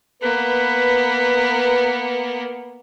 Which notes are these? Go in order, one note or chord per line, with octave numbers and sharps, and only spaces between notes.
A#3 B3 B4